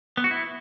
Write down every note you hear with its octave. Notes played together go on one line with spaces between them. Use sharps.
B3
F#4
E4